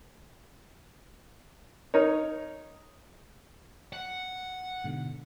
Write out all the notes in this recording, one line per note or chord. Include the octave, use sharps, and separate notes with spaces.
D#4 A#4 C#5
F#5
G#2 B2 D3